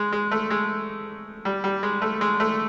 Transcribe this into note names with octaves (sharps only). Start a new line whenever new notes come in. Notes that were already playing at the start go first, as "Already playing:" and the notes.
Already playing: G#3
G#3
A3
G#3
G3
G3
G#3
A3
G#3
A3